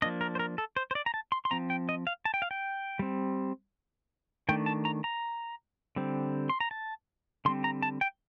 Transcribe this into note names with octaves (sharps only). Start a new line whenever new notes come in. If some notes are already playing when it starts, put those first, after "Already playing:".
F3 A#3 D4 D#5
A#4
C5
A#4
A4
C5
C5
D5
A#5
A5
C6
C6
F3 C4 A#5
G5
D#5
F5
A5
G5
F5
G5
G3 C4
D#3 A3 D4 G5
A5
A#5
A#5
D3 G3 C4
C6
A#5
A5
D3 G3 C4 C6
A#5
A5
G5